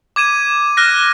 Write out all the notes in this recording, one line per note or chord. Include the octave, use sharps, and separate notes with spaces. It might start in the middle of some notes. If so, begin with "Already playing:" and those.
D6 G#6 D#7 E7
F6 F#6 A#6